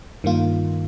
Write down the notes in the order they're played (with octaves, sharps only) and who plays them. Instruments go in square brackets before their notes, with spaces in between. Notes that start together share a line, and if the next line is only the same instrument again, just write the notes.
[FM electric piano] G2 D#3 A#3 F4